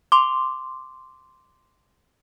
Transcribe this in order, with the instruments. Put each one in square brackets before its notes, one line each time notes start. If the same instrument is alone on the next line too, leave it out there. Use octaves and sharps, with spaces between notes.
[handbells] C6 D6